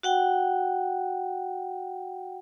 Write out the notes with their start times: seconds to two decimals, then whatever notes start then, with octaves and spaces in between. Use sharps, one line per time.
0.03 F#4 F#5 G5